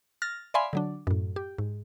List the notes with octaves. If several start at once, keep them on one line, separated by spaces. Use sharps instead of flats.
F6 A6 A#6
D5 E5 F5 G#5 B5 C6
D3 F#3 D4
F#2 A2
G4
G#2